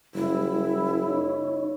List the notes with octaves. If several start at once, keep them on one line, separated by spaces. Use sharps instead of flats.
F#1 G3 E4
D#4 C#5